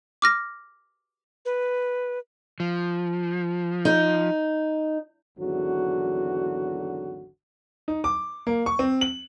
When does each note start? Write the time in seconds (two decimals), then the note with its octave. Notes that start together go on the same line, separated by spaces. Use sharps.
0.22 D6 F6 A#6
1.45 B4
2.60 F3
3.85 D#4
5.38 G#1 E2 D3 F#3 F#4
7.88 D#4
8.04 D6
8.47 A#3
8.66 C#6
8.79 C4
9.01 F#7